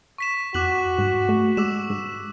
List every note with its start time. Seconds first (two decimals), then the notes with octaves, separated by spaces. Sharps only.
0.18 C#6 B6 E7
0.54 F2 F#4 D6 F#6 F#7
0.98 G#2
1.29 A3
1.57 G#3 D6 E6 E7
1.90 G#2